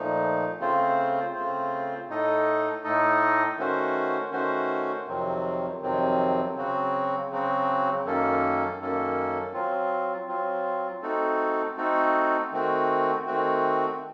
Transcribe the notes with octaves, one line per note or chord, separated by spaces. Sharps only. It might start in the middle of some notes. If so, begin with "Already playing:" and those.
Already playing: A#2 F3 A3 D#4
C#3 A3 C4 F4 C5
C#3 A3 C4 F4 C5
A2 A3 D#4 A4 D#5
A2 A3 D#4 A4 D#5
D#3 A3 C#4 F#4 C5
D#3 A3 C#4 F#4 C5
F2 C3 D#3 F#3 C4
F2 C3 D#3 F#3 C4
C#3 F#3 C4 F#4
C#3 F#3 C4 F#4
F#2 D#3 A#3 C#4 A4
F#2 D#3 A#3 C#4 A4
F#3 C4 F4
F#3 C4 F4
A3 C4 D#4 F#4 A4
A3 C4 D#4 F#4 A4
D#3 A3 C4 F#4
D#3 A3 C4 F#4